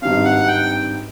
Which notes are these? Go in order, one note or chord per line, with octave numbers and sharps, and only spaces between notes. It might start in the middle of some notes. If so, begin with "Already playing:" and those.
G#1 G2 D#3 G3 C4 F5
F#5
G5